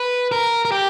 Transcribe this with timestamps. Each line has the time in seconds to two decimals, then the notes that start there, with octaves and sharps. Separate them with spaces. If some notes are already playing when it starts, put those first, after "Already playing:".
Already playing: B4
0.32 A#4
0.65 A#4
0.72 G4